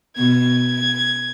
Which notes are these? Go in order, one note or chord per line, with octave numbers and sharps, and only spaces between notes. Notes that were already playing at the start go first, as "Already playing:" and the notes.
B2 G#6